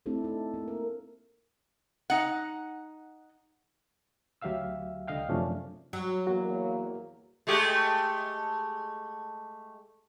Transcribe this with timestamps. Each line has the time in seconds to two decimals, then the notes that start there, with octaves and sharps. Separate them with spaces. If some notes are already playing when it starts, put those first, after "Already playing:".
0.06 A3 C4 D4 E4 G4 A4
0.24 D#4 A4
0.54 A#3
0.68 A#4
2.10 D#4 F#5
4.42 D2 F#3 G4 E5 F5 E6
5.08 C#2 D3 D#5 F5 G5
5.29 F#2 C3 F3 A3 C#4 D4
5.93 F#3
6.27 E2 A#3 F#4
7.47 G#3 A3 G4